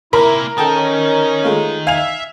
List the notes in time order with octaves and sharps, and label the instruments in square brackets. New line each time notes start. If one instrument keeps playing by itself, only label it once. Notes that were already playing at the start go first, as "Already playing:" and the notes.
[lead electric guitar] C3 A#3 [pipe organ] E4 [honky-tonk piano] A#4 [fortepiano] B5
[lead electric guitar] D#3 D#4 [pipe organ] C#4 [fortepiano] A4 G5 A5
[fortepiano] G#3 A3 F4
[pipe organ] E5 [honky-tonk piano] F5 F7 [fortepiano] G#5